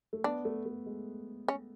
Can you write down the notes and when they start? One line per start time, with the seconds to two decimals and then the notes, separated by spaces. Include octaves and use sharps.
0.13 A3
0.24 B3 D4
0.45 A3
0.66 A3
0.86 G#3
1.48 C#4